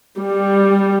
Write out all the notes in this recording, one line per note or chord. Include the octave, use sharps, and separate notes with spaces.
G3